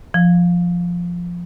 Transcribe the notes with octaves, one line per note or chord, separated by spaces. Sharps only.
F3